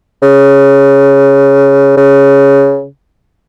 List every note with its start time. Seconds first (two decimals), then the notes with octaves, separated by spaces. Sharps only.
0.22 C#3
1.97 C#3